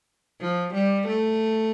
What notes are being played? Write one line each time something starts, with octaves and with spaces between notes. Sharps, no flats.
F3
G3
A3